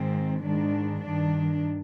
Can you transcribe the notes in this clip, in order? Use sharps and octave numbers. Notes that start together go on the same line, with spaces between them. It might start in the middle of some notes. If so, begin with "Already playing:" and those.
Already playing: G#2 D#3 C4
G#2 D#3 D4
G2 D#3 D4